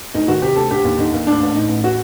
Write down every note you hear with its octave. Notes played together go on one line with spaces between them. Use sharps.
D2 D#4
D#3 F#4
C3 G4
D2 A4
D3 G4
D#2
D3 D#4
D#2
A2 D4
A1
A2 D#4
A1
F#4